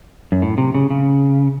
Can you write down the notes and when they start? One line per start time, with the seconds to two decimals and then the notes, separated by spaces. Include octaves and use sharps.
0.32 F#2
0.42 A2
0.58 C3
0.75 C#3
0.90 C#3